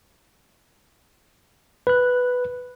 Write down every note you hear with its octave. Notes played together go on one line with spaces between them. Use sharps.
B4 F#6